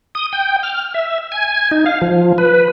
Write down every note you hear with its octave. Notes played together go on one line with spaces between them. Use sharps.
D#6
G5
F6
E5
G#5
D#4
F5
F3
B4